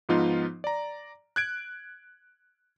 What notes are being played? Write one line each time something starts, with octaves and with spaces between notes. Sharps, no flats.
G#2 F3 B3 D#4 F4
D5 A#5
F#6 G#6 D7